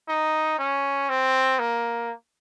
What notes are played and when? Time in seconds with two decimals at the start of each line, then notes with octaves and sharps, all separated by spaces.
0.08 D#4
0.58 C#4
1.09 C4
1.59 A#3